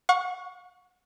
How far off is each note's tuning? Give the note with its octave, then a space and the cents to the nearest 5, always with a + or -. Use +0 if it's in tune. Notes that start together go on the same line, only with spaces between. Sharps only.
F#5 -40 C#6 +5